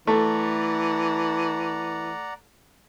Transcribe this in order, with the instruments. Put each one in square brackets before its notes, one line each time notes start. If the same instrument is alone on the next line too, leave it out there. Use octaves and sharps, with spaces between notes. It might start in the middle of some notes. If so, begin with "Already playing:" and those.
[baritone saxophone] E3 [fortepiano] A3 [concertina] D5 F#5 A#5